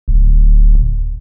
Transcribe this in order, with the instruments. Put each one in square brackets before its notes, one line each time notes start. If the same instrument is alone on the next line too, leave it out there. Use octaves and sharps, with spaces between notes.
[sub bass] D1